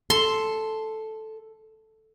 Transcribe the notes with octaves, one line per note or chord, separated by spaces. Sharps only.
A4 C6